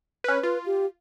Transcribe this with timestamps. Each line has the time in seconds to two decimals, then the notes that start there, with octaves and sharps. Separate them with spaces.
0.24 C#4 B4
0.43 F4 B4
0.66 G4